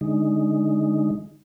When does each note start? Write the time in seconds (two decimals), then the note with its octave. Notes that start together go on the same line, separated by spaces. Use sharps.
0.01 D3 G#3 D#4